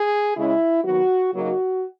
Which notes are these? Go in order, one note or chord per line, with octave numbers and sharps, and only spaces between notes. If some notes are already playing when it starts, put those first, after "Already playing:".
Already playing: G#4
C#3 G#3 C#4 E4
D#3 F#3 B3 F#4
C#3 F#3 A#3 D#4 F#4